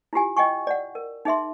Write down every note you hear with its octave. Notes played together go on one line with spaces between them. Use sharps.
E4 F4 G4 G#5
D#5 G5 G#5 C#6
D5 F#5
A#4
D#4 G#4 E5 C6